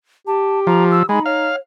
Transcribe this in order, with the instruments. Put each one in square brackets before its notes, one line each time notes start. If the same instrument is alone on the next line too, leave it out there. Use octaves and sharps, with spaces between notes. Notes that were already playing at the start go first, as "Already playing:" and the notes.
[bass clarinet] G4 [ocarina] A5
[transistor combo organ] F3 [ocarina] A#5
[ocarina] E6
[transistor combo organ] G#3 [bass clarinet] D#4 [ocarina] B5
[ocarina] C#5 [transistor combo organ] F5